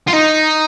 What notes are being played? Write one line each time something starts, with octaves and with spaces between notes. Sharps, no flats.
F4
D#4